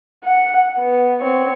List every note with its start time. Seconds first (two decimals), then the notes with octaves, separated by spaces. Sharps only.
0.24 F#5
0.79 B3
1.21 C4 C#5